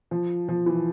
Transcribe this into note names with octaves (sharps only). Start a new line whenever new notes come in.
F3
F3
E3